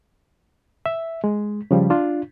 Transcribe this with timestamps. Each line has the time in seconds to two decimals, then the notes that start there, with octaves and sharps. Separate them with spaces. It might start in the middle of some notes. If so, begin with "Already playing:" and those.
0.86 E5
1.24 G#3
1.71 C#3 F3 G3
1.90 D4 F4